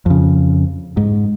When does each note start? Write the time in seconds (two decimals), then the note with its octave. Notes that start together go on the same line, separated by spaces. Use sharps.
0.06 F2 C#3
0.97 G#2